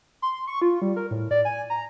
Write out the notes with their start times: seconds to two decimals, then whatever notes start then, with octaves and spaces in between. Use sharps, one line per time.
0.22 C6
0.47 C#6
0.62 F4
0.82 G3
0.96 A#4
1.11 A2
1.31 D5
1.45 G#5
1.70 A#5